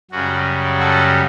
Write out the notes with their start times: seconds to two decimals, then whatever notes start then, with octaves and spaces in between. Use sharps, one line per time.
0.11 F#2 C#3 G3 F#4
0.79 F#4 A4